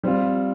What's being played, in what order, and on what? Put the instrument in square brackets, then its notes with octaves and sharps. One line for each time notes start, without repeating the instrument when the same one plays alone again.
[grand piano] G3 C4 F4